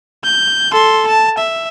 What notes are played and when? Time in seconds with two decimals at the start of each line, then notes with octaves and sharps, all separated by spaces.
0.24 G6
0.72 A4 C6
1.07 A5
1.38 E5